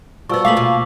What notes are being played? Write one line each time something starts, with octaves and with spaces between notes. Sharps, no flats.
F3 G3 B3 F#4 A#4 C#6 E6
A3 A#3 G#4 F5 D6 B6 F#7
B2 A#3 F4